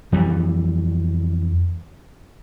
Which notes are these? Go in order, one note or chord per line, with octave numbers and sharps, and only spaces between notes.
F2 E3 G3